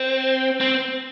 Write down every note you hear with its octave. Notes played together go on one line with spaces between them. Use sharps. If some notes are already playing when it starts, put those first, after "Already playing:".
Already playing: C4
C4